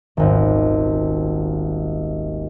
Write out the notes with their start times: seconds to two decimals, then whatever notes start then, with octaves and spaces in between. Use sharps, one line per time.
0.17 D#1 G#1